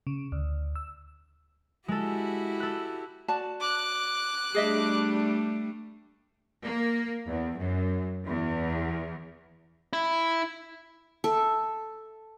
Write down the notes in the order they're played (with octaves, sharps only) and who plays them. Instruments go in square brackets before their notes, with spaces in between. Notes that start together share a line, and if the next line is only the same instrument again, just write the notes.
[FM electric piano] C#3
D2
E6
[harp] G#3 A4 [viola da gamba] E4 F#4 G4
[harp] A4 F#6
[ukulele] F#4 D5 A5
[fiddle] D6 F#6
[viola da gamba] G3 A3 D4 [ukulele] G#4 D#5 E5
[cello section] A#3
E2
F#2
E2
[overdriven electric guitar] E4
[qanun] A4 E5